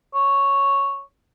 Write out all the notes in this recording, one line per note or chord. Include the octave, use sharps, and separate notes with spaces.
C#5